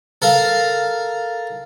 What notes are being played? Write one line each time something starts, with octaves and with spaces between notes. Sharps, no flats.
A4 A#4 F5